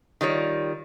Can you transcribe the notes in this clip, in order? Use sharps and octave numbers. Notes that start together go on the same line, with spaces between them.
D#3 G3 F4 C#5